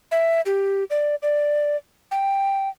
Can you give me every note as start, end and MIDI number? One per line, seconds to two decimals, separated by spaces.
0.11 0.41 76
0.46 0.84 67
0.90 1.15 74
1.22 1.77 74
2.11 2.69 79